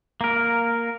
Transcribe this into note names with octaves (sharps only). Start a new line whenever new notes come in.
A#3 A#4